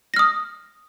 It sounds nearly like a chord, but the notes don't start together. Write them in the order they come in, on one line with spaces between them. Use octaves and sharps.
A#6 F6 D#6